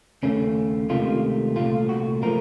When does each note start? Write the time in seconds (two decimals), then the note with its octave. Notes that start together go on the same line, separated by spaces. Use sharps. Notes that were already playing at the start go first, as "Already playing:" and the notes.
0.23 D#2 C#3 A3 C#4
0.89 C#2 C3 D#3 A3 F4
1.56 C2 A#2 A3 F4
1.89 F#4
2.22 F3 A3 A#4